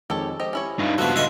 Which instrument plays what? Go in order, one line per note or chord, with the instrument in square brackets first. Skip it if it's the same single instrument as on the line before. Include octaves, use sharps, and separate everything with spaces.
[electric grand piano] F2 D#3 G#3 [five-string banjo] G4 A4 C#5
[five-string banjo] G4 D#5 [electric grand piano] C5
[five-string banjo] C#4 E4 C#5 [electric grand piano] G4
[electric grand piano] G2 [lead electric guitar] D#4 F4
[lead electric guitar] C#2 F#4 [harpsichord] F3 B3 [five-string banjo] A4 E5
[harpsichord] F4 D#5 C#6 [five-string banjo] B4 E5